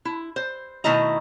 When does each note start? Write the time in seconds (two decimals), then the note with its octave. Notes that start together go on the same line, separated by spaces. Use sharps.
0.05 E4
0.36 C5
0.84 B2 D#3 A3 E4 D#5 A#5